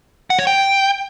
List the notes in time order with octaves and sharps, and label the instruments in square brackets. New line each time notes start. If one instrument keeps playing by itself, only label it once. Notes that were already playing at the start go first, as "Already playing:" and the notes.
[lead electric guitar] F#5
C#5
G5